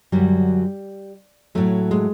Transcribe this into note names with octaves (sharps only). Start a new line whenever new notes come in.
F#2 D3 F#3 G3
A2 F#3 A3
G#3